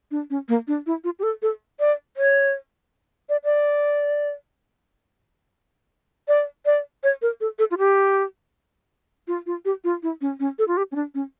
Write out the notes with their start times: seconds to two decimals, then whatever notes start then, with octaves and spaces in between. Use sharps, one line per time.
0.11 D4
0.30 C#4
0.48 A#3
0.67 D4
0.86 E4
1.04 F4
1.19 G4
1.23 A4
1.42 A4
1.79 D5
2.17 C#5
3.29 D5
3.44 D5
6.28 D5
6.66 D5
7.03 C#5
7.22 A#4
7.41 A4
7.59 A4
7.71 F4
7.78 G4
9.27 F4
9.46 F4
9.65 G4
9.84 F4
10.03 E4
10.21 C#4
10.40 C#4
10.59 A4
10.68 F4
10.77 G4
10.92 C#4
10.95 D4
11.14 C#4